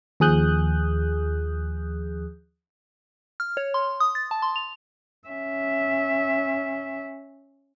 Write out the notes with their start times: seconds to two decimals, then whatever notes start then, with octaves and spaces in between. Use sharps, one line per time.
0.20 D#2 F3 G#4 D#6 F#6 G6
3.40 F6
3.57 C#5
3.74 C6
4.00 D#6
4.15 A6
4.31 A5
4.42 C6
4.56 F7
5.28 C#4 E5